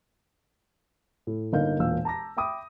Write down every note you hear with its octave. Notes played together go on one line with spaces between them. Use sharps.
A2
G1 A#3 D#4 F5 G6
E1 A#2 F5 E6
A5 A#5 D6 A#6
E5 G5 B5 D6 D#6